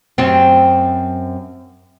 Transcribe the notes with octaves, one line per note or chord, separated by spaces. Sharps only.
F#2 C4